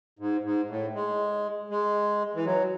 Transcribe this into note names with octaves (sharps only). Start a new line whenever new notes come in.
G#2
G#2
A2
G#3
G#3
E3
F#3